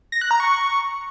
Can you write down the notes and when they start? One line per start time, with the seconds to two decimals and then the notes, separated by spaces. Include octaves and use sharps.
0.12 A#6
0.21 F#6
0.31 A#5
0.40 C#6